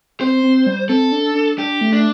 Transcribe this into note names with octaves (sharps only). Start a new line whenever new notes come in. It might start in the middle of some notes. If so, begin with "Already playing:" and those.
C4 C5
C4
G3
C4 A4
D4
D4
D4 G4
A3
D4